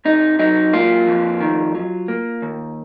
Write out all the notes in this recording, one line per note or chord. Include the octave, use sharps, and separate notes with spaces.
C3 D#4
F#3 D#4
A#3 F4
F2
D#3
F#3
A#3
D#2